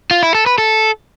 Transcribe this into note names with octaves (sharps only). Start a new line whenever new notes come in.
F4
E4
A4
B4
A4